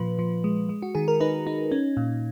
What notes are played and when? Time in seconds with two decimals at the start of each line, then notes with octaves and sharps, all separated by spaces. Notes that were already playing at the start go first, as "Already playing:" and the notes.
Already playing: A#2 F3 B4
0.19 F3
0.44 G#3
0.69 G#3
0.82 F#4
0.95 D#3 G#4
1.08 A#4
1.20 D#4 B4
1.47 D#4
1.71 C#4
1.97 A#2